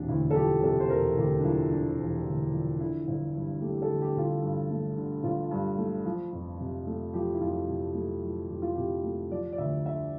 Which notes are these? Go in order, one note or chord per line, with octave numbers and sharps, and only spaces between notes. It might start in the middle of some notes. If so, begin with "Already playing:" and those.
Already playing: E1 C3 D4
D2 E4
A4
F3 G4
C3 A4
C5
E1 A#4
D2 G4
D4
F3 E4
C3 D4
E1
D2
F3
D3 E4
G1
G2
A3 G4
G4
A4
D3
G4
G1 F4
G4
G2
A3
D3
G1 F4
G2
A3
F3
F2
C3
A3
F3 G4
E4
F2 F4
C3
A3
F3
F2 G4
F4
C3 G4
A3
F3 D5
D5
D2 E5
D3 E5